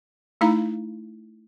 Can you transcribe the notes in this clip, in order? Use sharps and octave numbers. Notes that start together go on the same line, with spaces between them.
A3 D#4 E4 F5 A#5